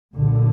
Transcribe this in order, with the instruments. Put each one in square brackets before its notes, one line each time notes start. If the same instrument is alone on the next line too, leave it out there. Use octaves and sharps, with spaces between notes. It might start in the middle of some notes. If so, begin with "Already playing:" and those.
[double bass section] B1 A#2 D3